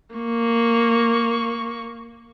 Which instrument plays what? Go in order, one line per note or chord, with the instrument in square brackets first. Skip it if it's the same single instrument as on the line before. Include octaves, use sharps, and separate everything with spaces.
[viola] A#3 C#6